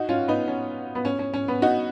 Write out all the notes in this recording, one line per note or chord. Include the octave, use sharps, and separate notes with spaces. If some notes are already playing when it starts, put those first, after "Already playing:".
Already playing: D#4 F#4
C#4 F4
B3 D#4
C#4
B3
C#4
C#4
C#4
B3
D#4 F#4